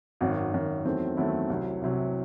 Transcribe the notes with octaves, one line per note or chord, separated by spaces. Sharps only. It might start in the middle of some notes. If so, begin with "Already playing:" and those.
G#1 F#2 D#3 F#4
G#1 F#2 D#3
E2 D#3 F#3 A3 C4
E2 D#3 F#3 A3 C4 E4
C2 C3 F#3
C2 C3 F#3